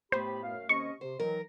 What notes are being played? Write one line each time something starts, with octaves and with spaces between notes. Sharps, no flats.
A2 B3 G4 C5 B5
F#2 A3 F5
D#2 C3 C#4 D#5 C#6
C3 C5
D#3 E3 F#3 A#4